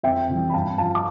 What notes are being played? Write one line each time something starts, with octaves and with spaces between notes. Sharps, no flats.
F2 E5 G5
C3 E3 G3
B5
G2 F5 A5
F3 F5 A5
D6